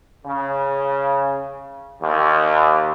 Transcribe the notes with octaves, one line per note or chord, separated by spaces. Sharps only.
C#3
D#2